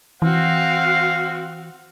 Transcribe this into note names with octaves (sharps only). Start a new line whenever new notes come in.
E3 C4 F#4 F5